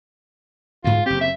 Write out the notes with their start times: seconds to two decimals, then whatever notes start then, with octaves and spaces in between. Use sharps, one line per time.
0.84 D2 G#2 F4
1.06 F#1 C4 G4
1.21 E5